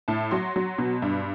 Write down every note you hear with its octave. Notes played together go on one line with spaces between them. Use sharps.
A2 A5
F#3 C6
F#3
B2
G2